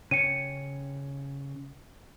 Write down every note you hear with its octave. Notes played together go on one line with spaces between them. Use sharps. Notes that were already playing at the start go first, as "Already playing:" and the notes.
C#3 C#5 G5 C#7 D#7